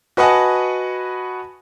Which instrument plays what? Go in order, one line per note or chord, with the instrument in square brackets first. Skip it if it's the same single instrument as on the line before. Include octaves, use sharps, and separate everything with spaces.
[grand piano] F#4 B4 D#5 F#5 G#5 A5